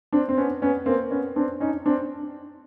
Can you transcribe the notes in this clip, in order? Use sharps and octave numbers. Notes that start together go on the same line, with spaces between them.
C4 D4
C4
B3 C#4
B3 C#4
A#3 C4
B3 C#4
C4 D4
C#4 D#4
C4 D4